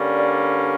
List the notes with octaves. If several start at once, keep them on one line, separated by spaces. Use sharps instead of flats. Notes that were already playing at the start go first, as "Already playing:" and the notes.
Already playing: G2 D3 G3 A#3 C#4
D5